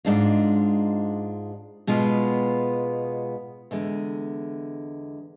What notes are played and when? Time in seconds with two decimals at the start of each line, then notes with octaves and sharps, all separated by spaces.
0.05 G#2 G#3 D4 F4
1.87 B2 G#3 B3 F4
3.71 E2 D3 G#3